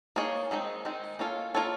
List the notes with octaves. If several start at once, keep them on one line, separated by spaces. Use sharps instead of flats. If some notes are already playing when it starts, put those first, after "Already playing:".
A#3 D#4 G#4 C#5
D#3 G#3 C4 D#4
D#3 G#3 C4 D#4
A#3 C#4 F4 A4 C#5
A#3 C#4 F4 A4 C#5